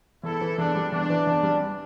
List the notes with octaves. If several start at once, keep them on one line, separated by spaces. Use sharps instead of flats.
E2 E4 A4
E3
E2 D4
G3
E2 D4
E3
E2
G3